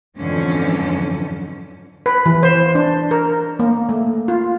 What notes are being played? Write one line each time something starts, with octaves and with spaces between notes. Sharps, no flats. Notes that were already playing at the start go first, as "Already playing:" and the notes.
F2 G#2 D3 E3 F#3 C#4
B4
E3
C5
D4
A#4
A#3
A3
F4